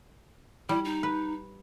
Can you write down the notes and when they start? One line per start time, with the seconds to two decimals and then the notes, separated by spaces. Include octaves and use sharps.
0.69 G3 E4
0.85 D#4
1.03 B4